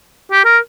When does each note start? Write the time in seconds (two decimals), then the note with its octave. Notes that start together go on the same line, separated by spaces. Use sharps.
0.32 G4
0.45 A#4